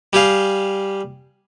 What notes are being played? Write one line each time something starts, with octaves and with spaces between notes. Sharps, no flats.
G3 G4 G#4 F5